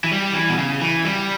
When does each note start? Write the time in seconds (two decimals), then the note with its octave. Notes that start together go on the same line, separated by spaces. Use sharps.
0.04 E3
0.11 G3
0.34 E3
0.49 B2
0.58 C#3
0.81 E3
1.05 G3